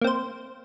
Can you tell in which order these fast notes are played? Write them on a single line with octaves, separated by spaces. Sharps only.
A#3 C4 C5